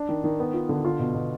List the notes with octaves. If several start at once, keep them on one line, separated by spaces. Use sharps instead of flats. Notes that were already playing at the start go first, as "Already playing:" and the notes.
Already playing: D4
D#3
D#3
B3
F4
D3
F4
B2
B2